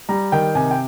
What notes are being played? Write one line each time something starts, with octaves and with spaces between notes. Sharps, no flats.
G3 A#5
D#3 G5
C3 G#5
G5